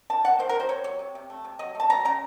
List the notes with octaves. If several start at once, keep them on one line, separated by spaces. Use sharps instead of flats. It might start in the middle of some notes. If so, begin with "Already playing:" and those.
D#3 A5
A#3 F#5
D#3 C5
A#4
F#3 C5
C3 C#5
F#3 C#5
C3
C3
A3
C3
F#3 D#5
A3 A5
F#3 A#5
C#3 A#5